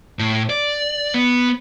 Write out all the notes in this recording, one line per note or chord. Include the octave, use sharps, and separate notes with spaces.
A2
D5
B3